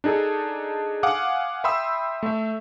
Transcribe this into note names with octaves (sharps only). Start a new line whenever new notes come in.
D4 D#4 G#4 A4
F5 F#5 G#5 D6 D#6
E5 G5 B5 C6 D#6 E6
A3 E5